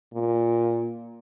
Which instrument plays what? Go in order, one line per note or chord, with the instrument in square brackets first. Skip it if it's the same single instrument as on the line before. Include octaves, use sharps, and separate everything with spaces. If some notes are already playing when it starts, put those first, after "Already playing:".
[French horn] A#2